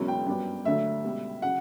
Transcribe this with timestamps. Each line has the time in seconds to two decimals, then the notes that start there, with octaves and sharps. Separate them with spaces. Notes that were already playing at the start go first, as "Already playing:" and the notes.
Already playing: E1 E2 C#3 F#3 C#4
0.08 G5
0.27 G2 F#3 B3 D4
0.65 D2 D3 F#3 A3 E5
1.04 C#2 B2 G3
1.42 C#3 F#3 F#5